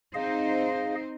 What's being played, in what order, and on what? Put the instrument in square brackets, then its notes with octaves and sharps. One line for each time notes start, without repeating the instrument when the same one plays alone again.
[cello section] C4 D#4 C5 [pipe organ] G#4 D#5 F5